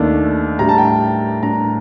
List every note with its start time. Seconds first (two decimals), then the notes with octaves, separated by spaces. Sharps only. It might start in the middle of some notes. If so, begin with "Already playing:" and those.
Already playing: D#2 D#3 A3 D4
0.59 A2 G3 D4 A#5
0.69 A5
0.78 G5
0.88 A5
1.43 A2 G3 D4 A#5